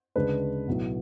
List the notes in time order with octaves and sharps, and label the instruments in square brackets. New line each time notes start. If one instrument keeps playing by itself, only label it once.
[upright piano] D2 C#3 G#3 D4 B4
B1 A2 F#3 B3